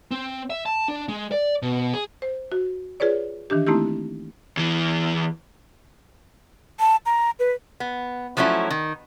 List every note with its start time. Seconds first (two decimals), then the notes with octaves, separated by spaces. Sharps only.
0.11 C4
0.50 E5
0.66 A5
0.88 D4
1.08 G#3
1.32 D5
1.62 B2
1.94 G#4
2.22 C5
2.52 F#4
3.00 F4 G#4 B4 C#5 D5
3.50 D#3 E3 D4 G4
3.67 A3 A#3 C4 D#4 E4 G4
4.57 E2 E3
6.80 A5
7.06 A#5
7.39 B4
7.80 B3
8.37 F3 F#3 A3 C#4 E4
8.70 D#3